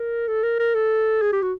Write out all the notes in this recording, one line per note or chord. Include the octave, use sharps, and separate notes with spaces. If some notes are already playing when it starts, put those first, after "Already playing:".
Already playing: A#4
A4
A#4
A#4
A4
G#4
G4
F#4